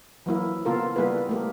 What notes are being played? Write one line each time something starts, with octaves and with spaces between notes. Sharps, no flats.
E3 F#3 A#3 E4
C#3 A#3 B3 F4 A4 A#4
G3 A#3 B3 E4 G#4 B4
A3 A#3 G4